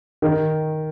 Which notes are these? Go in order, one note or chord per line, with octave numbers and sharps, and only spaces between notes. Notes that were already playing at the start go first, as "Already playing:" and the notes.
D#3